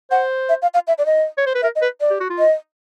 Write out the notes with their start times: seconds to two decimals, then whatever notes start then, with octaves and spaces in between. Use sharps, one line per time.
0.11 C5 F#5
0.49 E5
0.62 F5
0.74 F5
0.88 E5
0.98 D5
1.06 D#5
1.38 C#5
1.46 C5
1.55 B4
1.62 A#4 E5
1.76 D#5
1.82 B4
2.01 D5
2.10 G4
2.20 F#4
2.30 F4
2.39 D#5